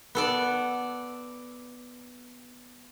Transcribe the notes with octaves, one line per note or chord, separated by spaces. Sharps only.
B3 A4 D5